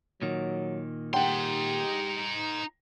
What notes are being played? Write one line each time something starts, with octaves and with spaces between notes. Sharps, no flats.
A#2 D#3 F#3
D#4 G4 F#5 G5 C6